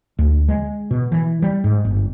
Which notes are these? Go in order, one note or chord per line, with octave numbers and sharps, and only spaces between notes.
D2
G#3
B2
E3
G3
G#2
G1